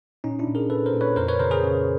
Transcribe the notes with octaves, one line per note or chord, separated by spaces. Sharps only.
A#2 C#4 D#4
D4 E4
A#2
G#4 A#4
A#2 A4 B4
A#4 C5
A#2
B4 C#5
F2 A#4 C5
B4 C#5
C#3 A#4 C5
G#4 A#4
C#3